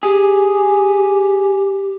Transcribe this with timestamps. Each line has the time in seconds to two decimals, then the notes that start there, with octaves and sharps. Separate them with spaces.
0.03 G4 G#4